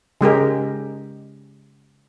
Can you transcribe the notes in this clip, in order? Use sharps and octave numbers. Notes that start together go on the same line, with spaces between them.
C#3 G#3 G4 A#4